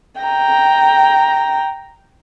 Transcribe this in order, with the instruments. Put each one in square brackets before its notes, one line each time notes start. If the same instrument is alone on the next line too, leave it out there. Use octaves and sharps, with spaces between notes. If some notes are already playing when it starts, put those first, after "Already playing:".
[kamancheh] G5 A#5